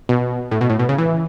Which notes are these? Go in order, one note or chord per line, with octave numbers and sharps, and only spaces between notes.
B2
A2
B2
A2
B2
C#3
E3